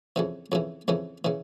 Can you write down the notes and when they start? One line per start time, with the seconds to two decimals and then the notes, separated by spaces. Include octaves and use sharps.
0.16 F2 C#3 E3
0.52 F2 C#3 E3
0.88 F2 C#3 E3
1.25 C#3 E3